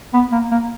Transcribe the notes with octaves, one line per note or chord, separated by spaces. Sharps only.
B3
A#3
A#3